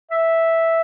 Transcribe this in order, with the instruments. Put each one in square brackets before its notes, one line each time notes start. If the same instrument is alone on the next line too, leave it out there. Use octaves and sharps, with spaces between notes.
[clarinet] E5